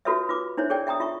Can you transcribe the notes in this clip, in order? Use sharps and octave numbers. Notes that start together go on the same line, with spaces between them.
F4 F#4 A4 B4 C#5 E5
F4 B4 D6
D4 E4 C5 C#5 E5
G#4 A4 C#5 D5 G5
E5 G5 A#5 D#6
F4 E5 A#5 C#6